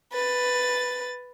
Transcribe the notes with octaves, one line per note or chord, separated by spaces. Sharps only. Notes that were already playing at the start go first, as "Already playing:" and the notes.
B4 A6